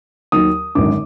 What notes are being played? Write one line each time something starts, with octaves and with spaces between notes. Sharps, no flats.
D#2 D#3 F#3 D#6
G#1 F#2 D3 D6